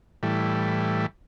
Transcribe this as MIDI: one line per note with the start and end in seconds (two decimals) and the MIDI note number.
0.23 1.06 45
0.23 1.06 52
0.23 1.06 55